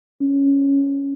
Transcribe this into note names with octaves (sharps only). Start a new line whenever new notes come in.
C#4